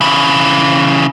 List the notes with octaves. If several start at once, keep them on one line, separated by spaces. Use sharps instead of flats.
C#3 E3